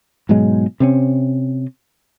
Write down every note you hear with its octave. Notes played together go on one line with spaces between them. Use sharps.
G#2 B2 F#3 G#3
C3 C4 C#4